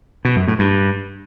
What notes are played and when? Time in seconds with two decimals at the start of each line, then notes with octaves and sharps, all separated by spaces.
0.25 B2
0.36 F#2
0.48 A2
0.59 G2